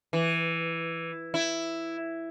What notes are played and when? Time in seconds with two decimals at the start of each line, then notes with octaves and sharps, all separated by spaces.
0.13 E3
1.34 E4